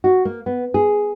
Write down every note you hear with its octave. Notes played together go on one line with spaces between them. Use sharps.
F#4
A#3
B3
G#4